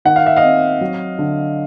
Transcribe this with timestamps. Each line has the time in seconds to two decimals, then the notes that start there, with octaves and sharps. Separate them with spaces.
0.05 D#3 F#5
0.16 F5
0.26 E5
0.36 D#5 F5
0.43 C4
0.81 F#3
1.19 D3